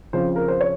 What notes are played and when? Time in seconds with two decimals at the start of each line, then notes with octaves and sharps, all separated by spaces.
0.13 F2 C#3 F3 C4 C5
0.36 A#4
0.48 C5
0.61 C#5